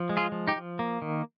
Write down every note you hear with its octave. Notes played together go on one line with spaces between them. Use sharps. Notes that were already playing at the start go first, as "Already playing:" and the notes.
Already playing: F3
G#3
F4 G#4
F3
D#4 G4
F3
A#3
D#3